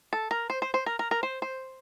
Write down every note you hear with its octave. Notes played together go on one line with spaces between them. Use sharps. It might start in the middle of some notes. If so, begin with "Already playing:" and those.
A4
A#4
C5
C5
C5
A#4
A#4
A#4
C5
C5